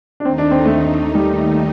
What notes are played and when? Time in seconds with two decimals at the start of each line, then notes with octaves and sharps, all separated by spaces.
0.20 D4
0.25 D#2 D#3 A3 C4 D#4
0.38 D4
0.51 C4
0.66 A3
1.15 G3